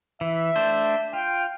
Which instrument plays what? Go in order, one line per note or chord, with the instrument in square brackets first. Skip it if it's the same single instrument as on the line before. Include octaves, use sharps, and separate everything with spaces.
[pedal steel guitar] E3 [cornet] E5
[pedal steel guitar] A3 D4 C5
[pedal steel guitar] F4 [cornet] G5